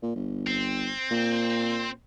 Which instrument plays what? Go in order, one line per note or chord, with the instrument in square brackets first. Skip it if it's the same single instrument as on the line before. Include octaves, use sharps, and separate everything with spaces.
[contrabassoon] A#2
G1
[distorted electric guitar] C4
[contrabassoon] A#2